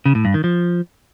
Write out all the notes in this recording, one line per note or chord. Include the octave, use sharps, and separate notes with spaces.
C#3
A2
G2
D#3
F3